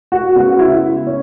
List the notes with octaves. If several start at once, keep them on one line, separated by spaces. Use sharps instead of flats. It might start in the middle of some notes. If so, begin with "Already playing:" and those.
F#4
C#3 G#3 B3 F#4
E4
C#4